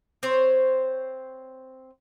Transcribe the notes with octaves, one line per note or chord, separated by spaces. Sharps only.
C4 C5 C#5